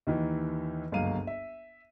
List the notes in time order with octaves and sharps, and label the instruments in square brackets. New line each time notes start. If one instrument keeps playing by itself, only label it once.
[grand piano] D#2 D#3 E3
G1 C#2 F#2 A#3 F5 D#7
E5